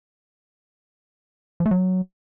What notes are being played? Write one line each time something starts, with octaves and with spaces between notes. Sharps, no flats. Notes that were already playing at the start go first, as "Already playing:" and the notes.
F3
A3
F#3